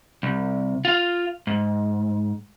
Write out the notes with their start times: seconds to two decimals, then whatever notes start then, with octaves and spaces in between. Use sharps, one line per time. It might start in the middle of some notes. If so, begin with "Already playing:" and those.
0.23 C2
0.85 F4 F5
1.47 G#2